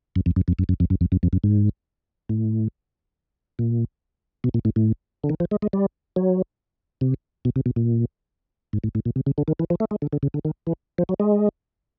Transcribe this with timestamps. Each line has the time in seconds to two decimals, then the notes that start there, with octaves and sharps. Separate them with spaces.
0.16 F#2
0.26 F2
0.36 F#2
0.48 F2
0.59 F#2
0.69 F#2
0.80 F2
0.90 F#2
1.01 F2
1.12 F#2
1.23 F2
1.33 F#2
1.44 G#2
2.29 A2
3.59 A#2
4.44 B2
4.54 A#2
4.65 A2
4.76 A2
5.24 D3
5.29 D#3
5.40 F3
5.51 G#3
5.62 G#3
5.73 G3
6.16 F#3
7.01 C3
7.45 B2
7.56 C3
7.66 B2
7.76 A#2
8.73 G#2
8.84 A2
8.95 A2
9.05 A#2
9.16 C3
9.26 C#3
9.38 D3
9.48 D#3
9.59 E3
9.70 F3
9.80 A3
9.91 G#3
10.02 D3
10.13 D3
10.23 C#3
10.34 D3
10.45 D#3
10.67 E3
10.98 F3
11.09 F#3
11.20 G#3